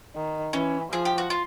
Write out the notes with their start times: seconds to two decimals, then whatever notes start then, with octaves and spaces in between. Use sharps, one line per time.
0.15 D#3
0.53 E3 C#4
0.92 F3 G#4
1.05 G4
1.18 F#4
1.30 F4